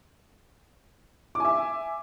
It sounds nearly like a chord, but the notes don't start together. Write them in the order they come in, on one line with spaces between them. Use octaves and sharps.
D6 G#5 E5